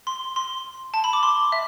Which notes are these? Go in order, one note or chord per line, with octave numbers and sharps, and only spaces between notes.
C6
C6
A5
B5
D6
C6
E5